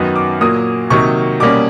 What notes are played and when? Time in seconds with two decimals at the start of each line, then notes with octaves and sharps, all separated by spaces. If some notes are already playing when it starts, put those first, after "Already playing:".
Already playing: F#2 D#3 F#3 B3
0.16 D6
0.41 A#2 F#3 A#3 D#6
0.90 C3 D#3 F#3 A#3 C#6
1.40 B2 G3 A#3 C#4 D6